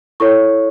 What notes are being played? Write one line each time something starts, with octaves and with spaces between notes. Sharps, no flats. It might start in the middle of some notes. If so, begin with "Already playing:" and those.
E4 A4 C#5 C#6